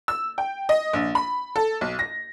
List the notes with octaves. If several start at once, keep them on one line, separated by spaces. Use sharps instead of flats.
E6
G5
D#5
A#1
B5
A4
B1
A#6